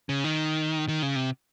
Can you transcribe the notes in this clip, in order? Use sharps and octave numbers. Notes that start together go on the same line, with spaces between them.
C#3
D#3
D#3
C#3
C3